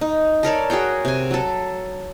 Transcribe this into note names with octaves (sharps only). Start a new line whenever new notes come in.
D#4
A4 A#4 C#5 D5
F#4 G#4 C#5 G5
C3 G#5
F#3 A4